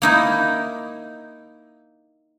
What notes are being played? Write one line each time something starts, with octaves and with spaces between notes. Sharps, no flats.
A#3 D#4 E4